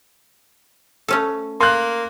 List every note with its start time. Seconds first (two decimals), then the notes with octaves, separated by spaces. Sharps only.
1.08 A3 C#4 A4
1.60 A#3 C6 F#6